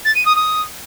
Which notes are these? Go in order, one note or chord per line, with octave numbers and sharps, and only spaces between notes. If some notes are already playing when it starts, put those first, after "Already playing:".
A6
D#7
D#6
D#6